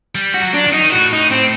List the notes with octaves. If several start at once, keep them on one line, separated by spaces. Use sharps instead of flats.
G3
F#4
F#3
D4
D#3
F#3 D#4
D#3
A2 F#4
D#4
C4